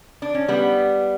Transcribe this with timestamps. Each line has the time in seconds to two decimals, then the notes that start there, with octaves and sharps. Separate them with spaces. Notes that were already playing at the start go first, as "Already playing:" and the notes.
0.22 D4
0.35 C#4
0.48 G3 B3